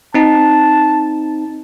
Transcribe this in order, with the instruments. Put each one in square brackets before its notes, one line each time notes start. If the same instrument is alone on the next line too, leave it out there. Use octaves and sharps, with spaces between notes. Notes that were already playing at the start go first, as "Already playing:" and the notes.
[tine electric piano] C4 D#4 [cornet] A5